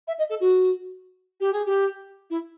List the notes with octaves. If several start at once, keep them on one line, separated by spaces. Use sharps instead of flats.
E5
D#5
A4
F#4
G4
G#4
G4
E4